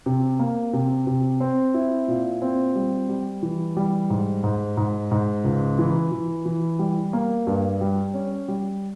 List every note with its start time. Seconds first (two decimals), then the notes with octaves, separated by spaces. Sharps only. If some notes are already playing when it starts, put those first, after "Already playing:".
0.06 C3
0.39 A#3
0.73 C3
1.07 C3
1.40 C4
1.74 E4
2.08 A#2
2.42 C4
2.76 G3
3.09 G3
3.43 E3
3.77 G3
4.10 G#2
4.44 G#2
4.77 G#2
5.11 G#2
5.44 C#2
5.79 E3
6.12 E3
6.46 E3
6.79 G3
7.13 A#3
7.47 G2
7.81 G3
8.14 C#4
8.48 G3